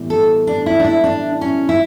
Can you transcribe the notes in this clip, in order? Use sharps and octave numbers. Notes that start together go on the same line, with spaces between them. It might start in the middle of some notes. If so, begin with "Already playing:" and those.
Already playing: A2 E3 G3 B3
A4
D4
E4
D4
E4
D4
C#4
E4